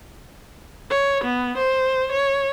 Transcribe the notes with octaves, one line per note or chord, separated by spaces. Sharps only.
C#5
B3
C5
C#5